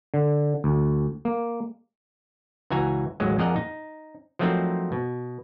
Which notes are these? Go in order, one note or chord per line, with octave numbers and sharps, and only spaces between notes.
D3
D2
A#3
C#2 E3 F#4 G#5 A#5
A1 D#2 F#3 G#3
F2 A#2 G#4 A#4 D#5 F#5
D#4
F3 F#3 A3 A#3 C4 D#4
B2